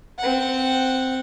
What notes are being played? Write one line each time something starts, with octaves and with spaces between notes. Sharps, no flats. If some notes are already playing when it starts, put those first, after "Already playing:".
C4 F#5